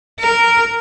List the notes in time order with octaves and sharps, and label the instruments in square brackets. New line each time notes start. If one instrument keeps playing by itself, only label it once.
[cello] A#4